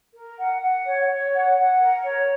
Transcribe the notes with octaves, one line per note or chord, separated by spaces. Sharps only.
A#4
F#5
F#5
C#5
C#5
F#5
F#5
A#4
C#5